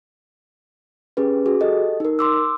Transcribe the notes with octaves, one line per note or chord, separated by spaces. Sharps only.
C#4 G4 G#4 B4
F#4 G#4
G4 A4 D#5
D#4 A#4
C6 D6 E6